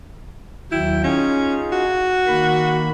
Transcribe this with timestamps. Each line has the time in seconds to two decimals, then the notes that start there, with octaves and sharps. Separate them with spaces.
0.72 D#2 F#3 E4 G5
1.04 C#4 D#4 F4 G#4
1.72 F#4
2.27 D#3 A#3 B5